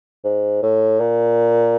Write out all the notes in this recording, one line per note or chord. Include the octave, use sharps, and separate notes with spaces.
G#2
A2
A#2